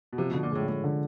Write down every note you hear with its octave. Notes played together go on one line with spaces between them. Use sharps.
B2
C3 F3
B2 D3
A#2
A2 G#3
A2 G#3
D3